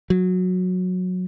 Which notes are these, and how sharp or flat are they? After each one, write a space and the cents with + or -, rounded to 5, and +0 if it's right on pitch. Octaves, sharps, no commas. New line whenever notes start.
F#3 -15